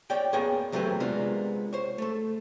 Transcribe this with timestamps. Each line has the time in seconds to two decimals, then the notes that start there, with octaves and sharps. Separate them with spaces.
0.10 C#5 D5 G5
0.33 A#3 B3 G#4 C#5 G5
0.72 E2 F#3 A3 C4 G4 B4
1.00 C3 G#3 A#3 B3 D4 F4
1.73 C5 C#5
1.98 A3 A4